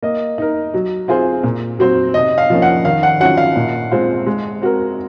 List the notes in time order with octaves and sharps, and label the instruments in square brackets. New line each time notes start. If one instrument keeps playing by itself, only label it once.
[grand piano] A#3 [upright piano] D#5
[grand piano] D#4 A#4
F#3
C4 F4 G#4 C5
A#2
F#3 C4 F#4 C5
[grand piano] C3 [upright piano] D#5
[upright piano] F5
[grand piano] F3 A#3 C#4
[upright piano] F#5
[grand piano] D#3 [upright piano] F5
[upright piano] F#5
[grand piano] F#3 C#4 F4 [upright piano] F#5
[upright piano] F5
[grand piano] A#2
G#3 C4 F4 C5
G#3
C4 F#4 A#4